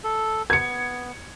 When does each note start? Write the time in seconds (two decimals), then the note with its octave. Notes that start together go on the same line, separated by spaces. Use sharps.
0.04 A4
0.50 B3 G#6 C#7